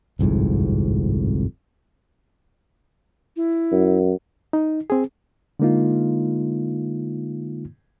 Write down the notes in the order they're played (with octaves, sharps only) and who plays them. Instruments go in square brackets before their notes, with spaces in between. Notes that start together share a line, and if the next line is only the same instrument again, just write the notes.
[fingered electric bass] G1 C2 F2 G#2
[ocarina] E4
[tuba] F#2
[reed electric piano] D#4
C4 G#4
D3 G#3 A#3 D#4 F4